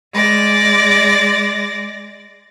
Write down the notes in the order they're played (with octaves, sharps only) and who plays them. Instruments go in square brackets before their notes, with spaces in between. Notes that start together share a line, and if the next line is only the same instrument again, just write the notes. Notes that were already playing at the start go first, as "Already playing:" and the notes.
[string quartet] G#3 D5 A#6